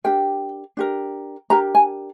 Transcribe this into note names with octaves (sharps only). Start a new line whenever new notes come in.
D4 G4 A#4 G5
D4 G4 A#4
D4 G4 A#4 A#5
G#5